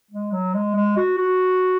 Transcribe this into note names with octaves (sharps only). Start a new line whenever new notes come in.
G#3
F#3
G#3
G#3
F#4
F#4